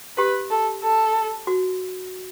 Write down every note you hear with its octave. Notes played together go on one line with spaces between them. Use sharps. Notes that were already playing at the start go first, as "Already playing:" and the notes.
G4 B4
A4
A4
F#4